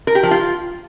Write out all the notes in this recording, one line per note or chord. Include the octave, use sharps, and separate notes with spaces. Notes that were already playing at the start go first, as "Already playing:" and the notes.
A#4
G4
F3
F4